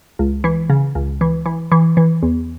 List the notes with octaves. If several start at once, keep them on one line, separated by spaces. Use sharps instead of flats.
C#2
E3
C#3
C#2
E3
E3
E3
E3
E2